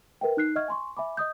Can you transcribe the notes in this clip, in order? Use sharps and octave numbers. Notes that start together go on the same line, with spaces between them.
A#4 B4 E5 G5
D#4 F#6 C7
D#5 E5 F#5 C#6 F6 G#6
G#5 C6 C#6
E5 G#5 B5 D6
D#5 D#6 G6